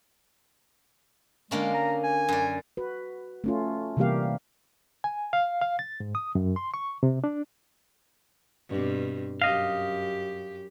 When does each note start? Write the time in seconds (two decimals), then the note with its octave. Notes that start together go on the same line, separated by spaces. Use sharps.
1.51 D3 G#3 A#3 C#4
1.74 A#5
2.04 G#5
2.29 F#2 D5
2.77 F#4 B4
3.44 A3 C#4 F4
3.97 C3 E3 G3 A#3 G4 F5
5.04 G#5
5.33 F5
5.62 F5
5.79 A6
6.00 G#2
6.15 D#6
6.35 F#2
6.56 C6
6.74 C#6
7.03 C3
7.24 D4
8.69 G2 B2 C4
9.42 F#2 G4 D#5 F5